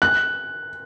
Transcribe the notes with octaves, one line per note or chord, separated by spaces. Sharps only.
F#6